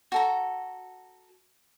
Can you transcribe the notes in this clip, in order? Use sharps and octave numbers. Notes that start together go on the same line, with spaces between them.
F#4 A4 A#5